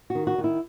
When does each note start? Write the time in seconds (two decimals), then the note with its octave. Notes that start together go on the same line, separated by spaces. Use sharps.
0.10 F#4
0.15 D#3
0.27 F#4
0.38 D#3
0.44 E4